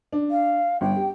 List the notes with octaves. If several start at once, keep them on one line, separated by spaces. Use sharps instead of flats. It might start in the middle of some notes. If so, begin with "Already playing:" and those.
D4
F5
G1 G5
G4